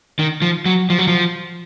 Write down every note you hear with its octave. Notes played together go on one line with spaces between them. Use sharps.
D#3
F3
F#3
F3
F#3
F3